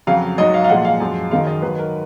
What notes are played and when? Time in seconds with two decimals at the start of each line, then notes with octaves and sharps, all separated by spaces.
0.07 F2 C#3 F#3 F5
0.38 G#2 F#3 D#5
0.54 F5
0.64 F5
0.69 A#2 F3 G#3 F#5
0.85 F5
1.00 F#2 F3 G#3
1.31 F#2 D#3 G#3 F5
1.47 D#5
1.62 G#2 D#3 F#3 B4
1.79 A#4